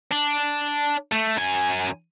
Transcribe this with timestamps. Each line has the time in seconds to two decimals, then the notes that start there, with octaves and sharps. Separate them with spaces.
0.12 D4
1.12 A3
1.37 F#2 G#5